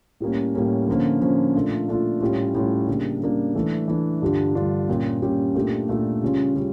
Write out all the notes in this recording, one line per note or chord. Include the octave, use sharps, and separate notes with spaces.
A2 G3 A#3 C#4
A2 G3 A#3 C#4
D3 F3 A#3 C#4
D3 F3 A#3 C#4
A#2 A3 D4 F4
A#2 A3 D4 F4
A2 G3 C#4 F4
A2 G3 C#4 F4
C#3 G3 A#3 D4
C#3 G3 A#3 D4
E3 A3 D4
E3 A3 D4
G2 D3 G3 D4 F4
G2 D3 G3 D4 F4
A#2 G3 C#4 G4
A#2 G3 C#4 G4
A#2 A3 D4 G4
A#2 A3 D4 G4
C#3 G3 C#4 F4
C#3 G3